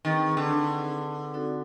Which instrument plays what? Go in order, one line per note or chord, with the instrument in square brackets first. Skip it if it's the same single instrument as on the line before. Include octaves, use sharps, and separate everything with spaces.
[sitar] D#3 [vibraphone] C4 D#4 G#4 B4
[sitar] D3
[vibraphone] C4 D#4 F#4 A4 D5